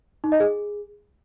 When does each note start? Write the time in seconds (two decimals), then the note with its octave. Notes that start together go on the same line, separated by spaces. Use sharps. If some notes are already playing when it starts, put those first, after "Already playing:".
0.24 D#4
0.32 D#5
0.40 G#4